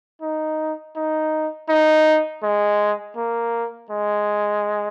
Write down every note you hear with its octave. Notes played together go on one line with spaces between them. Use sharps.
D#4
D#4
D#4
G#3
A#3
G#3